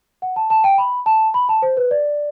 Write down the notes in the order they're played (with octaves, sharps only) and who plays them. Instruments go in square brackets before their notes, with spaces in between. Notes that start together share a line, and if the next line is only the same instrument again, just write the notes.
[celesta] F#5
A5
A5
G5
B5
A5
B5
A5
C5
B4
D5